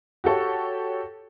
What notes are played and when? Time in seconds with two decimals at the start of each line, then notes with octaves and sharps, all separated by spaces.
0.24 F#4 G4 A4 C#5